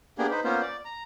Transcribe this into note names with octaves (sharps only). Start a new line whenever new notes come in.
A#3 B3 D4 G4 G#4
D#4 B4 C5
A#3 B3 C#4 F4 C5
D5
A#5